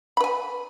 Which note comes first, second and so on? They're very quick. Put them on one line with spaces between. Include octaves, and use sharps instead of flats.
B5 B4 G#5